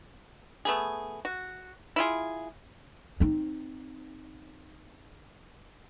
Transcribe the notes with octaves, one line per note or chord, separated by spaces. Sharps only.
A3 B3 G#4
F#4
E4 F4 G#4
C4 D#4